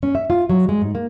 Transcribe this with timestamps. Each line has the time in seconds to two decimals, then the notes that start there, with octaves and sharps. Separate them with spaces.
0.03 C#4
0.15 E5
0.30 F4
0.50 F#3
0.69 G#3
0.82 G#2
0.95 A#3